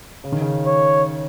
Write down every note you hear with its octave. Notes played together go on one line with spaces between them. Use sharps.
C#3
D#3
C#3
C#5